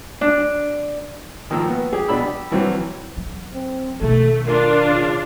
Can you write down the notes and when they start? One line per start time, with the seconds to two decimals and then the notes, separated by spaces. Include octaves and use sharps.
0.21 D4
1.50 G#1 D#3 F3 A#3 E6
1.67 B3
1.93 G4 G#4
2.08 B2 D4 B5 E6
2.23 G4
2.51 G2 E3 F#3 C4
3.17 F#3
3.54 C4
4.01 B2 D#3 A3 A4
4.47 D4 F4 A#4
4.86 C#3